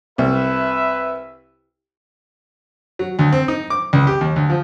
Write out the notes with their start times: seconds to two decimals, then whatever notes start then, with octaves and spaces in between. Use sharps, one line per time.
0.18 C2 B4 E5
2.99 F#3
3.19 D2
3.33 C4
3.48 D#4
3.70 D6
3.93 C#2
4.07 G4
4.21 D#2
4.36 D2
4.50 F3